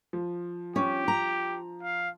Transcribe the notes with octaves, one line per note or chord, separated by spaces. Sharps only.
F3
C#4 G4
A#5
F5